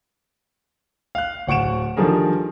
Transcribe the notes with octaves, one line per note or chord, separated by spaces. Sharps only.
F5 F#6
D1 F#5 C#6 D7 E7
D3 D#3 F3 G3 G#4 A#4